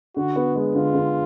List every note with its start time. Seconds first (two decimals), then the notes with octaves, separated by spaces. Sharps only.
0.16 D3 F#4
0.36 B3
0.56 G#3
0.75 D3 F4
0.95 D3